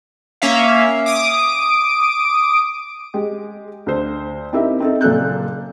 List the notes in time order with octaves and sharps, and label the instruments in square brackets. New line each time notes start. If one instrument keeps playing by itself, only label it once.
[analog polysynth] A#3 C#4 E5 F5
D6 D#6 D7
[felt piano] G#3 G4
D2 C5
C4 D#4 E4 G4 A#4 E5
C4 D#4 A4
F#1 A#2 A4 F#6 G6